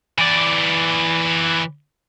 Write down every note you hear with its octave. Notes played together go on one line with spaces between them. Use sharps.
E3 D5